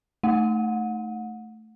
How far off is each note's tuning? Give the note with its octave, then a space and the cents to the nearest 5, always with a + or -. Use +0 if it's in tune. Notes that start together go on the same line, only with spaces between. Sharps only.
A3 +0 F#5 -30